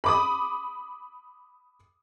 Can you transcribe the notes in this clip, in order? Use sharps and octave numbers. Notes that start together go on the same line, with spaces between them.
B5 D6 D#6